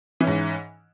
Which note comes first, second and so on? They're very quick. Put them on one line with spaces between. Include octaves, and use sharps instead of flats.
E3 C#4 G#2